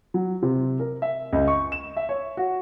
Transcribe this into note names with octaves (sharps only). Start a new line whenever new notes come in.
F#3
C3
A#4
E5
C#2
C#6
E7
E5
C#5
F#4